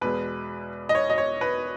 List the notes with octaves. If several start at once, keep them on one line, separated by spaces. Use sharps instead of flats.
E2 B2 G#3 B4
D#5
C#5
D#5
C#5
B4